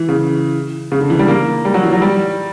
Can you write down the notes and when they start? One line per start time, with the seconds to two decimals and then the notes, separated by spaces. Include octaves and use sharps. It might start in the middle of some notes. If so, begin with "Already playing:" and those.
Already playing: E3
0.09 C#3
0.92 C#3
1.01 D3
1.10 E3
1.19 G3
1.28 A#3
1.65 G3
1.74 F#3
1.83 E3
1.92 F#3
2.02 G3